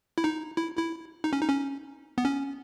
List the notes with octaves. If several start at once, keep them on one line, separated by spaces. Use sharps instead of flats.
E4
D#4
E4
E4
D#4
C#4
D#4
C#4
B3
C#4